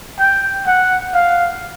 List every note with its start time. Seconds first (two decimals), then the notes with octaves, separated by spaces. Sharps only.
0.20 G5
0.67 F#5
1.14 F5